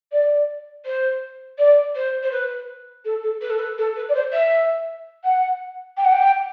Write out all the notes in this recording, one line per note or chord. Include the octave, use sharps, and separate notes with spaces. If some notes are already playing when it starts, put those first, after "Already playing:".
D5
C5
D5
C5
C5
B4
A4
A4
B4
A4
B4
A4
B4
D5
C5
E5
F#5
G5
F#5
G5